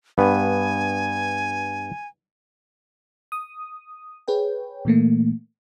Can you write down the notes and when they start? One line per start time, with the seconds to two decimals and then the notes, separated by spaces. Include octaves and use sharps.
0.18 G2 B3 G#5
3.32 D#6
4.28 G#4 B4 C#5 G5
4.85 A#2 E3 A3 A#3